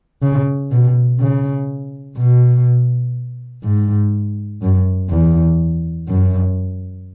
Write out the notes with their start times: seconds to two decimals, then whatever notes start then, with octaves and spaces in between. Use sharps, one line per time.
0.22 C#3
0.71 B2
1.20 C#3
2.18 B2
3.64 G#2
4.62 F#2
5.10 E2
6.08 F#2